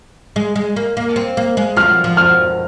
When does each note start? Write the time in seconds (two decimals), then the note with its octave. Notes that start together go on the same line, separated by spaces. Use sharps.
0.36 G#3
0.56 G#3
0.76 A#3
0.97 A#3
1.16 C4
1.37 A#3
1.57 G#3
1.77 F3 F6
2.04 F3
2.17 F6